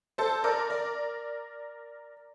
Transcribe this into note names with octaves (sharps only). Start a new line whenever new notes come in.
A4 C5
A#4 D5
A#4 D5